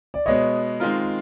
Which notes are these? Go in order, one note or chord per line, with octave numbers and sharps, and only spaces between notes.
D5
B2 G#3 B3 C#5 D#5
D#3 G#3 C4 F4 A#4